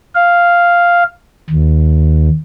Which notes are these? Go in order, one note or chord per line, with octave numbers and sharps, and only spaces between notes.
F5
D#2